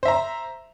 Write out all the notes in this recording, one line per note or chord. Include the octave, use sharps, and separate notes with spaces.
C5 E5 A#5